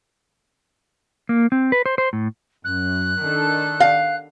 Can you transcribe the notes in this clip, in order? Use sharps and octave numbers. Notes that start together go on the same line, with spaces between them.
A#3
C4
B4
C5
C5
A2
F#2 F#6
D#3 D4 A4
F5